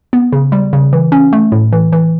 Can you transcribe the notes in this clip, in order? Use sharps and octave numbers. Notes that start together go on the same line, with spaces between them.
B3
C#3
G3
C#3
E3
C#4
A3
A2
E3
E3